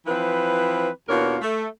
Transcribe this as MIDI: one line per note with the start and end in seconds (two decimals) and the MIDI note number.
0.06 0.88 52
0.06 0.88 53
0.06 0.88 60
0.06 0.88 71
1.09 1.36 39
1.09 1.36 47
1.09 1.36 62
1.09 1.36 65
1.09 1.36 70
1.09 1.36 73
1.41 1.66 57